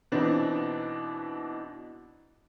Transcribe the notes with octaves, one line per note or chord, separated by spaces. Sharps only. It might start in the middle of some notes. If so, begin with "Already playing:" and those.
B2 E3 C4 D4 D#4